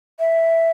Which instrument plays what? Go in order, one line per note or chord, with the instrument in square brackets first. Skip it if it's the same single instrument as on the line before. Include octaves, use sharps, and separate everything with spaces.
[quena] E5